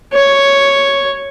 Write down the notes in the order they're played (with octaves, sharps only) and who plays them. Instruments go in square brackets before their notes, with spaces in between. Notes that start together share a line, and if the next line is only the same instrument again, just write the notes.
[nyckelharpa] C#5